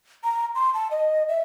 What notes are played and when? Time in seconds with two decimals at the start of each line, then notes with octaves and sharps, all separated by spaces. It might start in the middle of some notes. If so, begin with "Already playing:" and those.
0.24 A#5
0.55 C6
0.74 A5
0.91 D#5
1.29 E5